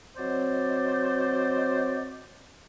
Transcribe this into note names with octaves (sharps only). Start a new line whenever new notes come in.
F#3 C4 C5 D5 D#5